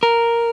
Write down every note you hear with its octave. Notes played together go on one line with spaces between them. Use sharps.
A#4